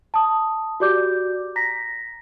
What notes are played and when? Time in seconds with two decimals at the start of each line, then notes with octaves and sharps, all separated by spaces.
0.14 A5 D#6
0.80 F#4 G4 D5 D6 G6
1.56 A#5 A#6 B6